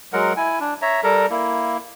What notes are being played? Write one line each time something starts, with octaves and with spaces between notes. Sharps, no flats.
F#3 G#3 A#4 F#5
E4 G#5
D4
C#5 E5 A#5
G3 A4 A#4 A#5
A#3 E4